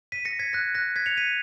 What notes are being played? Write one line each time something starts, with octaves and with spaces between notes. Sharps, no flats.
B6 D#7
A#6 C#7
G#6 B6
F#6 A#6
F#6 A#6
G#6 B6
C#7 F7
B6 D#7